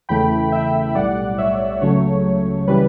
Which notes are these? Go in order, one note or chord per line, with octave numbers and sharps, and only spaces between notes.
E2 C#3 E3 A3 G5 B5
E5 G5
B1 A2 G3 D5 F#5
C#5 E5
C#2 C#3 F#3 A3 C#5
C#3 E3 G3 B4